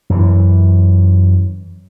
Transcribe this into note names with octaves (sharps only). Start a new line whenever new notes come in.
F#2 E3